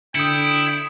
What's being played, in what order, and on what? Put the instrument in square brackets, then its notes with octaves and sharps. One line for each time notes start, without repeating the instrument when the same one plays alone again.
[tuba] D3 [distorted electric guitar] E4 [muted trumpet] G5 [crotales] D#6 C#7